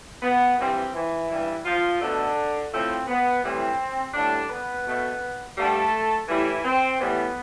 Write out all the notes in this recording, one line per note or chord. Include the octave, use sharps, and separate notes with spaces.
B3
G2 E3 G3 C4
E3 E4
G2 E3 G3
F3 F4
B2 D3 A3 D4
A2 F3 A3 C4
B3
A2 E3 G3 C4
A2 D3 G3 D4
B3 B4
B2 A3
G2 D3 G3 A3 A4
A2 E3 G3 E4
C4
A2 E3 G3 B3